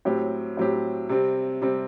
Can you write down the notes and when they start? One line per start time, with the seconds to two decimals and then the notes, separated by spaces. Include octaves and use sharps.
0.05 A2 F#3 C4 G4
0.57 A2 F#3 C4 G4
1.09 C3 G3 C4
1.62 C3 G3 C4